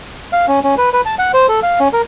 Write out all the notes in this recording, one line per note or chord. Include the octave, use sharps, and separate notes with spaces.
F5
C#4
C#4
B4
B4
A5
F#5
C5
A4
F5
C#4
A#4